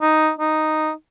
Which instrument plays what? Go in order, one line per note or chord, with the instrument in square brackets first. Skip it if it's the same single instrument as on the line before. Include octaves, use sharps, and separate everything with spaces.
[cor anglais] D#4
D#4